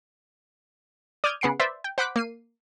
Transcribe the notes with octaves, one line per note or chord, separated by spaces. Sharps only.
D5 D#6 F6 G6 G#6
C#3 B3 F#5 C7 D7
B4 C5 D5 E5
G5
C5 F#5 B5 D6 F#6 B6
A#3 C7 D#7